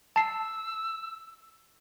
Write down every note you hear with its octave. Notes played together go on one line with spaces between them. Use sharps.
A5 E6 C7